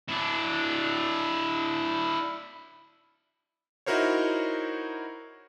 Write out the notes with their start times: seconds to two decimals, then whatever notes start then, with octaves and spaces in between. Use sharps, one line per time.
0.09 D4 E4
3.86 D#4 E4 F#4 A#4 C5 C#5